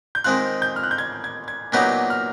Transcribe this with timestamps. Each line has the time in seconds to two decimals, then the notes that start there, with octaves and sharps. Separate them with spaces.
0.15 G6
0.24 D#3 G#3 C4 F4 F#6
0.62 G6
0.76 F6
0.83 F#6
0.91 G6
0.98 G#6
1.24 G#6
1.48 G#6
1.72 A#2 F#3 B3 D#4 G4 F#6
2.10 F6